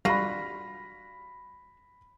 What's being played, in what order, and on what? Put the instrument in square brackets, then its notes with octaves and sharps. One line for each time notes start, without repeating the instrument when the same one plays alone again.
[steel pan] G3 [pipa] F4 F#4 [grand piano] B5 A#6